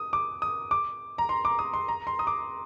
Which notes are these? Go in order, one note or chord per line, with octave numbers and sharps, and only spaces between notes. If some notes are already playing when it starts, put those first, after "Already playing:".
Already playing: D#6
D6
D#6
D6
A#5
C6
D6
D#6
C6
A#5
C6
D#6
D6